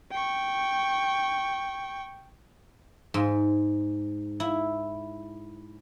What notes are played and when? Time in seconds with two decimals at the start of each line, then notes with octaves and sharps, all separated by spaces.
0.11 G5 C#6
3.14 G#2
4.40 E4